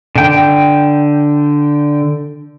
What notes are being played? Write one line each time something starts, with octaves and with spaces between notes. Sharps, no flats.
D3 G5